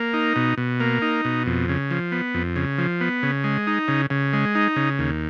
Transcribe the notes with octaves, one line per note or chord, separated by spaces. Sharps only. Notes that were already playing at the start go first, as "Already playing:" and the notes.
Already playing: A#3
D#4
B2
B2
A#3
D#4
B2
F2
C#3
F3
B3
F2
C#3
F3
B3
C#3
G#3
D#4
C#3
C#3
G#3
D#4
C#3
D#2